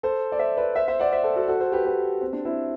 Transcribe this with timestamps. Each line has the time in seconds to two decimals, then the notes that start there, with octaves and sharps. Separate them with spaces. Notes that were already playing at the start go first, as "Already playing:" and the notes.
0.03 A4 C5
0.32 D5
0.39 C5 E5
0.57 B4 D5
0.76 C5 E5
0.88 C5 E5
0.99 D5 F#5
1.12 C5 E5
1.24 A4 C5
1.36 F#4 A4
1.48 F#4 A4
1.60 A4 C5
1.72 G4 B4
1.85 G4 B4
2.21 C4
2.33 D4
2.45 C4 E4